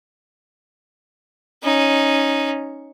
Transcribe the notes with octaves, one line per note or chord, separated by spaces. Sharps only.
C#4 D#4